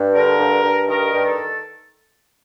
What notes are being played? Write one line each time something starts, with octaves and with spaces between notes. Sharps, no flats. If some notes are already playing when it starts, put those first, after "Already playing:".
Already playing: G2
D3 A#4
G2
G2
D#3 A#4
G2
A4